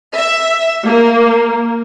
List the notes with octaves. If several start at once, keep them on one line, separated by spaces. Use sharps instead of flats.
E5
A#3